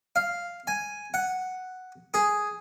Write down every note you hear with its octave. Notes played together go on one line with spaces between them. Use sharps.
F5
G#5
F#5
G#4